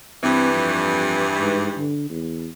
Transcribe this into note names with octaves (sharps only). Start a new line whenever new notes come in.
G2 E3 C4
F2
G#2
D3
E2